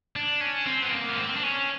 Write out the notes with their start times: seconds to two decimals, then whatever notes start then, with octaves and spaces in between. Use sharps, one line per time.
0.16 D4
0.41 C#4
0.67 C4
0.83 B3
0.92 A#3
1.09 B3
1.17 C4
1.36 D4
1.43 C#4